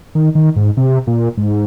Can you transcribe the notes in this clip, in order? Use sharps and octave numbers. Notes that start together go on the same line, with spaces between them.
D#3
D#3
G#2
C3
A#2
G#2